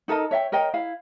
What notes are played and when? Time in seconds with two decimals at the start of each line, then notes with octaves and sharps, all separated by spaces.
0.08 D#4 A4 A#4 D#5
0.31 C#5 E5 F#5 G5
0.52 A#4 C#5 D#5 G5
0.74 E4 F5